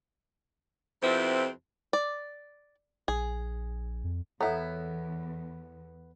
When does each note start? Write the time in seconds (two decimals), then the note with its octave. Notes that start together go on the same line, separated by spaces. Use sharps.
1.03 F2 C3 F3 B3 C4 E4
1.93 D5
3.08 A#1 G#4
4.04 F2
4.41 E2 B3 E4 A4 C#5 F#5 A#5